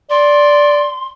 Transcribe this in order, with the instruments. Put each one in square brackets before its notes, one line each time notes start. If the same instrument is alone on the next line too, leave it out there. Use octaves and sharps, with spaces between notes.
[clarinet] D5 [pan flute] C6